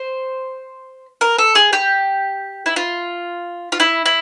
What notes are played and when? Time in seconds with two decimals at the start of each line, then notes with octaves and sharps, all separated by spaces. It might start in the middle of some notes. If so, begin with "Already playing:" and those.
Already playing: C5
1.21 A#4
1.38 A4
1.55 G#4
1.73 G4
2.66 E4
2.76 F4
3.72 F4
3.80 E4
4.06 E4